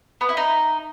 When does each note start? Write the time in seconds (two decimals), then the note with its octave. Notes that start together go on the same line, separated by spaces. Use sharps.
0.21 B3
0.29 E4
0.37 D#4